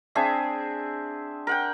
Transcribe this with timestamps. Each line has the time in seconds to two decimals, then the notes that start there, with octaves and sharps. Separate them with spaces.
0.15 C4 D4 G#4 E5
1.47 A#4 F#5 G5